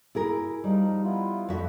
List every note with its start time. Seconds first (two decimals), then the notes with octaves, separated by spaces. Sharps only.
0.15 E4 G#4 A#4
0.64 F3 G3 D#4
1.04 B3 E4 F4
1.49 F2 F#4 E5